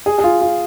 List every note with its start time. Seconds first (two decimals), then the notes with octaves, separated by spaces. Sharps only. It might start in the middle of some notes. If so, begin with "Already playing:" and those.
0.06 G#4
0.18 G#4
0.24 F4
0.41 F4